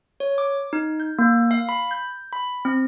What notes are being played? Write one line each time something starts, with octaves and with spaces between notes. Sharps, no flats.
C#5
D6
D#4
G6
A#3
F5
B5
G6
B5
C4